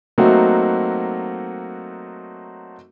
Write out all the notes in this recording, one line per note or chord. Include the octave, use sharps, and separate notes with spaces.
F#3 A3 A#3 C4 D#4 F#4